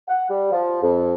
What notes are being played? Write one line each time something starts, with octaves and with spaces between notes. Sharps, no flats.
F#5
G3
F3
F2